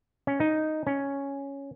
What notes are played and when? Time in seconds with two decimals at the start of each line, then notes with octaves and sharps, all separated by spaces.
0.27 C#4
0.40 D#4
0.87 C#4